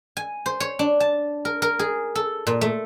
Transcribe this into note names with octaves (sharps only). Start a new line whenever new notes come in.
G#5
C5
C#5
D4
A5
A#4
A#4
G#4
A4
A#2
A3